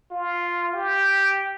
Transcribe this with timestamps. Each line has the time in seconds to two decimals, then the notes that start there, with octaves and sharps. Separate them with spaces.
0.11 F4
0.74 G4